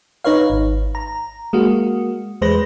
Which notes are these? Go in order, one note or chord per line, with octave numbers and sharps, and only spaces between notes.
D#4 B4 C#5 F5
G#1
A#5
G#3 A#3 F#4
E2 G#3 B4 C5 A#6